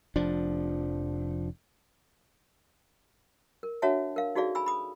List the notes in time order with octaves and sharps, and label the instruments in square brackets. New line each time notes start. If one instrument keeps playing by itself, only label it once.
[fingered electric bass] F1 F3 D4
[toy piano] A#4
D4 F#4 C#5 E5 F#5 A5
A#4 F5
D#4 F#4 G#4 A4 D5 F5
G#5 B5 E6
B5 D#6